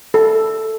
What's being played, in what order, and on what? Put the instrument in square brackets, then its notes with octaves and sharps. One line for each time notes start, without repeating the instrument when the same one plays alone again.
[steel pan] A4